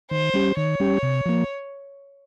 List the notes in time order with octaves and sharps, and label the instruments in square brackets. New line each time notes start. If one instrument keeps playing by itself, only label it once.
[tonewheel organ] D#3 [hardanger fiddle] C5
[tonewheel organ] G3 C#4 G4
[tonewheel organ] D#3 [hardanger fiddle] C#5
[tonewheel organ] G3 C#4 G4
C3
F3 A#3